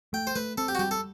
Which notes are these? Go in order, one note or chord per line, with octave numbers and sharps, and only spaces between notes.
A3 G5
C5
A3 B4
C4 A4
G4
F#4
G3 G4
A4